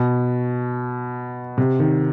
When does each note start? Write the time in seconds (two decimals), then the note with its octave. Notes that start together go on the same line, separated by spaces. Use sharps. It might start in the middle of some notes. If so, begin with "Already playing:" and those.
Already playing: B2
1.58 C3
1.79 D#3